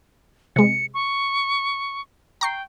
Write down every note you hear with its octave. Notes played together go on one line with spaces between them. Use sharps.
C3 G#3 C#7
C#6
G5 A#5 C#6 C7